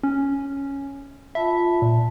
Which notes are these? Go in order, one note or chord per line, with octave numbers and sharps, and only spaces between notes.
C#4
F4 E5 A5 B5
A#2